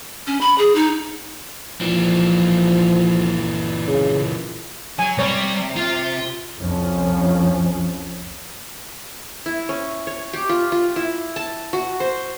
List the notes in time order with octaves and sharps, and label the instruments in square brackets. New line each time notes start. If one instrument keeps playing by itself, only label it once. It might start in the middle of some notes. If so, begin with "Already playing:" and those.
[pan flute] C#4
B5
G#4
D#4
[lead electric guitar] A#2 E3 [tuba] F3
[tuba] C#3
[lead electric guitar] F#3 [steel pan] G#5
[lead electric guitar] C3 [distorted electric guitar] G3 B5 [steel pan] C#5
[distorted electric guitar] F4
[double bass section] C2 F2 F3 C#4
[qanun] E4
C#4
C#5
G4
F4
F4
E4
A5
F#4
C5